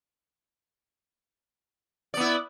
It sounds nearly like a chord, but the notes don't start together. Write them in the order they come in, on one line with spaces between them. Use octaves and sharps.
D5 B3 E4